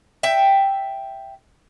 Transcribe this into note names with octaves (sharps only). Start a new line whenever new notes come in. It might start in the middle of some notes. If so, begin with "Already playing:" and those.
E5 G5